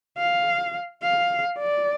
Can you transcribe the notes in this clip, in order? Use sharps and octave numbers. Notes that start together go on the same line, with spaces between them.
F5
F5
D5